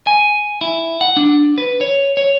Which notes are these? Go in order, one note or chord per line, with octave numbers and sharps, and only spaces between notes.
G#5
E4
F#5
D4
B4
C#5
C#5